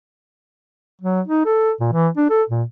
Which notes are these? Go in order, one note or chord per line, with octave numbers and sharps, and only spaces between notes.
F#3
D#4
A4
A#2
E3
D4
A4
A#2